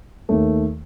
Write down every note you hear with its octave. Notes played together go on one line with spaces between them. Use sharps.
D#2 D#3 A3